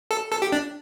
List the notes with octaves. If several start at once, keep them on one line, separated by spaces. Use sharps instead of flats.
A4
A4
G4
D4